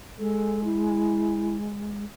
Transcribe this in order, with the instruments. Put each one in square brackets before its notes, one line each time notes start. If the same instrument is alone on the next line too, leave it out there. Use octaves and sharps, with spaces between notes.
[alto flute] G#3 [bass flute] A4
[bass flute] E4